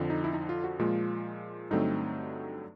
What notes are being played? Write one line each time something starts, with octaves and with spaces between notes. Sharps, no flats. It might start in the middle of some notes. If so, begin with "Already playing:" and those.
Already playing: F2 D3 F3
D#4
E4
D#4
F4
F#4
A#2 F3 G#3 F4
G2 D3 F#3 A3 C4 D#4